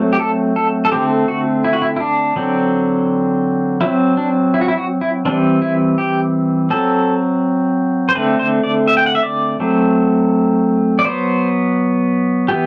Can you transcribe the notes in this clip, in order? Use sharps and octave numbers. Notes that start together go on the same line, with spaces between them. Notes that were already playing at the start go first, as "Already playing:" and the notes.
Already playing: F#3 A3 C4
G4
A4
A4
A4
D3 A3 C4 G4
F#4
E4
F#4
E4
E4
D4
D3 F#3 C4
F#3 C4 E4
D4
E4
F#4
E4
F#4
E4
E3 G3 C4 D4
E4
G4
F#3 C4 A4
C5
D3 A3 C4 B4
C5
D5
E5
G5
F#5
E5
D5
F#3 A3 C4
D5
F#3 B3 C5
E3 B3 G4